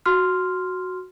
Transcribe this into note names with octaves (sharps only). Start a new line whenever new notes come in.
F#4 C6 F6